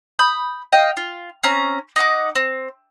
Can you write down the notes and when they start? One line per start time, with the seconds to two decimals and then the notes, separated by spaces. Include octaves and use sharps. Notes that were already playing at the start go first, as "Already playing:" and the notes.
0.19 B5 D#6 G6
0.72 D#5 F5 G5
0.97 F4
1.43 C4 C#4 A#5
1.96 D#4 D#5 F#5 D6
2.35 C4